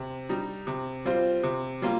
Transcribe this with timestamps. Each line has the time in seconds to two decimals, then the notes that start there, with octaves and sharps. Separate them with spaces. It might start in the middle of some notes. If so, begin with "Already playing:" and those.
Already playing: C3
0.29 G3 D#4
0.67 C3
1.05 G3 C4 F4 C5
1.43 C3
1.82 G3 A#3 F4